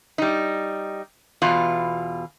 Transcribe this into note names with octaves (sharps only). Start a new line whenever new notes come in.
G3 D#4
E2 B2 F4